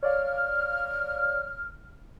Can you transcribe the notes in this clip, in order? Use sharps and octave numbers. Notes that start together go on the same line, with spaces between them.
C#5 D5 F5 F6